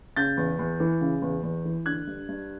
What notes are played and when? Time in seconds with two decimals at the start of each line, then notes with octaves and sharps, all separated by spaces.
0.16 C#3 G6 A6
0.37 E2
0.59 E2
0.80 E3
1.01 C#3
1.22 E2
1.43 E2
1.65 E3
1.86 D3 F#6 G#6
2.07 G2
2.28 G2